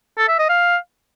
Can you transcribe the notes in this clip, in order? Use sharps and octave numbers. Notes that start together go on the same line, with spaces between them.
A4
E5
D#5
F5